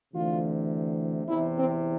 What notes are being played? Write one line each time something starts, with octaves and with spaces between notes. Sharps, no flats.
D2 C3 E3 F4
E2 C3 E3 E4
C4